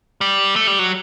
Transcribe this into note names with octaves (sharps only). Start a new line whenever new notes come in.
G3
A3
G3
F#3